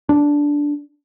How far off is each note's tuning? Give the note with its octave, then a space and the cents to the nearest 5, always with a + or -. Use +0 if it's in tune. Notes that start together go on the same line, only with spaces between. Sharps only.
D4 -10